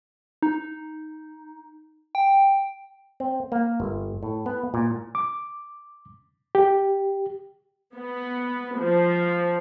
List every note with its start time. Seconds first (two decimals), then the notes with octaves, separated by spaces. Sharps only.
0.42 D#4
2.15 G5
3.20 C4
3.52 A#3
3.80 G1
4.23 A2
4.46 B3
4.74 A#2
5.15 D6
6.55 G4
7.96 B3
8.78 F3